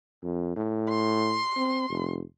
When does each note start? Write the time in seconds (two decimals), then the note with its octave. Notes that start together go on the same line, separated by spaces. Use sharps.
0.23 F2
0.56 A2
0.89 C6
1.56 C4
1.89 F1